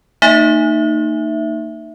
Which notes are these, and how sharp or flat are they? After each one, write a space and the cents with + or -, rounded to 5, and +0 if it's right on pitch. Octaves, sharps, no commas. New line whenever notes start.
A#3 -40 D#4 -20 E5 +0